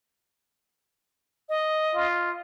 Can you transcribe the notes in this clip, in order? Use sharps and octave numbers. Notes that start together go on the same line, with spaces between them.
D#5
F4